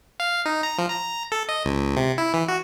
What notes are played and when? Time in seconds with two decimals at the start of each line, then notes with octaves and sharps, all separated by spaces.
0.20 F5
0.46 D#4
0.63 A#5
0.78 F3
0.90 A#5
1.32 A4
1.49 D#5
1.65 C#2
1.96 C3
2.18 E4
2.34 E3
2.49 F#4